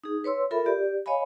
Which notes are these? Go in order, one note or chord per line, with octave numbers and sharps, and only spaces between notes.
D#4 G#4
B4 C#5 C6 E6
F4 A4 A#4 E5 B5
G4 D5
C#5 D#5 F5 G#5 B5